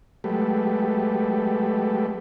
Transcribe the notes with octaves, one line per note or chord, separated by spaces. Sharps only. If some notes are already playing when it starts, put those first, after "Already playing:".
F#3 G#3 A3 G4 A4 B4